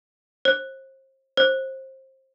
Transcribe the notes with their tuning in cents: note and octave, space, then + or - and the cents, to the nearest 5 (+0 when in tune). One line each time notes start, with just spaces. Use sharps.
C5 +35
C5 +25